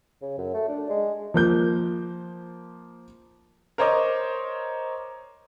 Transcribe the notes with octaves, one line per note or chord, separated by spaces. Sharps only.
C#3
F#2
A3
D4
G#3
F3 A#3 G6
A#4 C5 C#5 D#5 D6